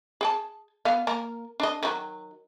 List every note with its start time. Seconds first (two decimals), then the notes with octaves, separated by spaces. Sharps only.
0.21 G#4 G5 A5
0.85 B3 F5
1.07 A#3 A#4
1.60 D4 D#5
1.83 D#3 F#3